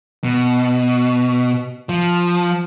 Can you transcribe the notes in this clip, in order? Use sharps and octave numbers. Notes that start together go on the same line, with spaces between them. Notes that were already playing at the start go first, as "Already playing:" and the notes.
B2
F3